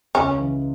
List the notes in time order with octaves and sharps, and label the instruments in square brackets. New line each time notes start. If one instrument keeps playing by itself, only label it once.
[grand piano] C#2 [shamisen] C#4
[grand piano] C#3 E3